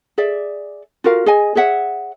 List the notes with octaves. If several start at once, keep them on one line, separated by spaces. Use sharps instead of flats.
G#4 D5 E5
F4 F#4 A#4 F5
G#4 D#5 G#5
G#4 C#5 E5 F#5